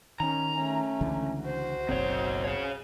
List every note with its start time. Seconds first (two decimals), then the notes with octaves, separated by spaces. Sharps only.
0.20 D#3 C#4 A#5
0.57 A3 C#4
1.01 C#2 D3 E3
1.42 F#4 C5
1.89 F#1 B1 D#3 C4 C#5
2.44 G#4 C#5